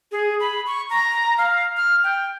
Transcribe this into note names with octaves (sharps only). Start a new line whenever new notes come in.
G#4
B5
C#6
A#5
F5
F6
G5